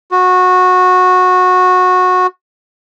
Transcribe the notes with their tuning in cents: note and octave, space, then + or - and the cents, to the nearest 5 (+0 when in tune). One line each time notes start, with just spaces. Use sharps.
F#4 -15